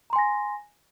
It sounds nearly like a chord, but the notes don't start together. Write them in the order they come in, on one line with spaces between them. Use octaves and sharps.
A#5 C6 G#5 A#6